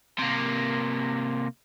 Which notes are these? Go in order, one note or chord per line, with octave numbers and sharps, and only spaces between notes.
C3 A#3